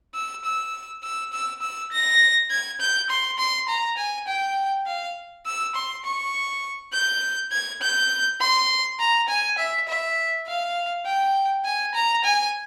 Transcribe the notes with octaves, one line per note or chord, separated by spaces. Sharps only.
E6
E6
E6
E6
E6
A#6
G#6
G6
C6
C6
A#5
G#5
G5
F5
E6
C6
C#6
G6
G#6
G6
C6
A#5
G#5
E5
E5
F5
G5
G#5
A#5
G#5